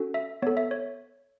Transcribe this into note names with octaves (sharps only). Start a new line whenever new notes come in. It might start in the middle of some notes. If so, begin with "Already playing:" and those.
Already playing: C#4 F#4 A4
E5
B3 A4 C#5
E5
C#5